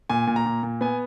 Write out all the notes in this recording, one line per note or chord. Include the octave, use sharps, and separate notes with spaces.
A#2 G#5
A#2
A#5
A#2
A#2
B3 G#5